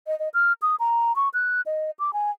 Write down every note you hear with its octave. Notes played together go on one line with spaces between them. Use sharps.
D#5
D#5
F6
D#6
A#5
C#6
F#6
D#5
D6
G#5